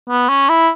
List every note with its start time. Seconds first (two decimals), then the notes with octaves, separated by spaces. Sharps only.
0.09 B3
0.29 C#4
0.49 E4